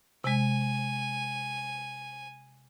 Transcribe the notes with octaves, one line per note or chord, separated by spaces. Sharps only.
C3 G#3 G#5